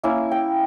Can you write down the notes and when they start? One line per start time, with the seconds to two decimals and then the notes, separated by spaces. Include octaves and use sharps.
0.03 A#3 C#4 E4
0.31 G5